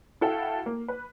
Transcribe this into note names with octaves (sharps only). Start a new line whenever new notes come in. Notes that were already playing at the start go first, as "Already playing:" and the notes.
E4 F#4 A4 F5 G5
A#3
B4